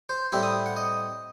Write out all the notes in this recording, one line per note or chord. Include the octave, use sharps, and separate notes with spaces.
C5
A2 G3 C4 E4 B5
D#6
F#5
D#5